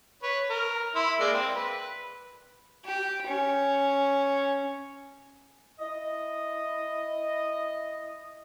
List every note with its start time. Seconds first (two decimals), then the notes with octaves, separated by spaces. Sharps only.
0.23 B4 C#5
0.50 A#4
0.95 E4 C6
1.20 G#3 A#3 D5
1.34 C4
1.54 B4
2.85 G4
3.26 C#4
5.80 E4 D#5